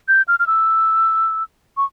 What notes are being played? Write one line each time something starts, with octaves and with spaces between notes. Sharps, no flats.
G6
F6
F6
E6
C#6